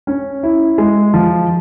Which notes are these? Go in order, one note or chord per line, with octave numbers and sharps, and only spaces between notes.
C#4
E4
G#3
F3